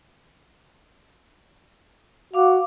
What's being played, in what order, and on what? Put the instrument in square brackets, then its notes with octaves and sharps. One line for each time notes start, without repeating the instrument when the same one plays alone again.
[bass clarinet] F#4 [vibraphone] F5 D6